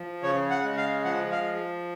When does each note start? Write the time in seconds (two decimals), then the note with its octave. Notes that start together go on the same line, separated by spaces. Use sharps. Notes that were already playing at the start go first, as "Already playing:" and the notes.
Already playing: F3
0.23 C#3 C#5
0.50 F#5
0.63 G#3
0.77 F5
1.04 F3 F#5
1.32 F5